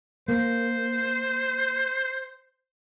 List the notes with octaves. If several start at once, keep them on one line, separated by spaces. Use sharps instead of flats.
A#3 C5